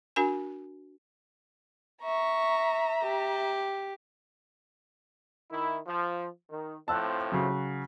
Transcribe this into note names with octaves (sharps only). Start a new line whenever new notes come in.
D4 F#4 A#4 G#5
E5 A#5 C#6
G4
D#3 E4
F3
D#3
A2 F3 C4 A5 E6 F#6
C#3 F#3